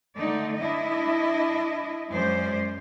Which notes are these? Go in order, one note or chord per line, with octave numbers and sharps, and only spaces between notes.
D3 A3 D#4 D5
D4 E4 D#5
F#2 G#3 C#4 C5 D5